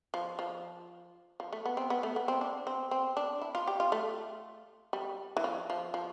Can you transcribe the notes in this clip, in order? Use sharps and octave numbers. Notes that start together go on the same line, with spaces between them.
F3
F3
F3
A3
B3
C4
B3
A3
B3
C4
D4
C4
C4
D4
E4
F4
G4
F4
A3
G3
E3
F3
F3
F3